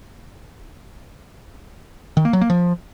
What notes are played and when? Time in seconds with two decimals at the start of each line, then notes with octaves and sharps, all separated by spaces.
2.17 D#3
2.25 A#3
2.33 F#3
2.41 A#3
2.50 F3